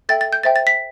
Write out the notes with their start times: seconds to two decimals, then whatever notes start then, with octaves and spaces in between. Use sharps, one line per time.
0.09 A4 E5 G5 A6
0.21 A6
0.33 G6
0.43 C5 E5 G5 A6
0.56 A6
0.67 B6